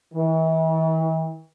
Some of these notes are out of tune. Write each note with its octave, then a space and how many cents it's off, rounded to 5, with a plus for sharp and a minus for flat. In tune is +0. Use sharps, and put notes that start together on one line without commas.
E3 -40